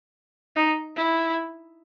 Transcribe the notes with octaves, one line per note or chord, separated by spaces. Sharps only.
D#4
E4